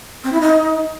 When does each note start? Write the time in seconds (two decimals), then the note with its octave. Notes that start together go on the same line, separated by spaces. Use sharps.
0.24 C4
0.33 E4
0.41 D#4